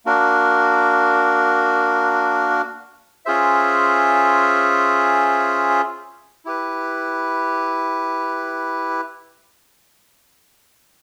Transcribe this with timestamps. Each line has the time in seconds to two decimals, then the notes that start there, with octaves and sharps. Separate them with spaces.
0.06 A#3 D4 F#4 A#4
3.25 C#4 F4 G#4 C5 E5
6.45 E4 G4 B4